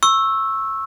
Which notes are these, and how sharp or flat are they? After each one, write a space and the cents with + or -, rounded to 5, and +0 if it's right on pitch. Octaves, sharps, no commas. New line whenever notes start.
C#6 -20 E6 +0